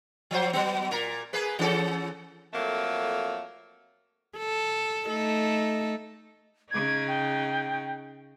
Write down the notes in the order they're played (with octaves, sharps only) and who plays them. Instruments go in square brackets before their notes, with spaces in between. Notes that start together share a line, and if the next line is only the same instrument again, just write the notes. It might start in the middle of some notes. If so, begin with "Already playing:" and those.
[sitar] F3 F#3 C5
F#3 B3
A#2 A#4
A#3 G#4 B4
E3 C#4 A4
[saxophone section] F2 F#3 A3 A#3
[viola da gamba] A4
A3 D#4 A4
[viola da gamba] C#3 D#4 [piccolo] G#6
[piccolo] G5